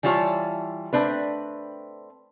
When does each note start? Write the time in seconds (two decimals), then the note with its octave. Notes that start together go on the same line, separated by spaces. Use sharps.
0.03 E3 G3 E4 F4 C#5 A5
0.93 A3 C4 D4 B4